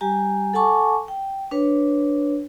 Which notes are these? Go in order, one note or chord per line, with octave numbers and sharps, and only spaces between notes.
G3 G4 G#5 A#5
A4 F#5 G#5 A5 C#6 D6
G5
D4 B4 C#5